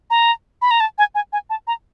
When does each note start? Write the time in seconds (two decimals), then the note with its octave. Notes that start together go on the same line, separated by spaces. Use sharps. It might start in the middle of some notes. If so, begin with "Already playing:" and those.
0.10 A#5
0.62 B5
0.71 A#5
0.80 A5
0.98 G#5
1.15 G#5
1.32 G#5
1.50 A5
1.67 A#5